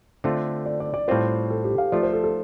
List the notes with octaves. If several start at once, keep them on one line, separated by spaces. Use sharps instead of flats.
D3 A3 C4 F4
D5
D5
D5
A2 G3 C4 F4 C5
A4
G4
F5
F3 A3 F4 D5
C5
A4
A4